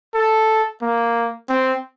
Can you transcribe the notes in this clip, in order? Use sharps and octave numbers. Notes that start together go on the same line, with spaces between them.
A4
A#3
C4